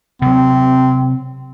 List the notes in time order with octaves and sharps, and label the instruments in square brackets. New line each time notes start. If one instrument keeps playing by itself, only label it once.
[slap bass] C3 F#3 [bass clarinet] C4